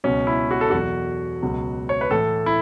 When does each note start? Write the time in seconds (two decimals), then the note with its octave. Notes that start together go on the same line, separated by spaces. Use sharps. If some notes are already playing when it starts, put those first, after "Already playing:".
0.04 C#2 B2 F#3 C#4
0.27 E4
0.51 F#4
0.61 A4
0.70 E2 B2 F#3 F#4
1.42 C#2 B2 F#3
1.89 C#5
2.01 B4
2.11 A2 E3 A4
2.46 E4